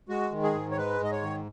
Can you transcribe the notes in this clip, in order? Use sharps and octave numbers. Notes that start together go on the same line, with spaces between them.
G#3 F#4
D#3
G#4
G#2
C#5
G#3 B4
G#2 D#5
C#5
D#3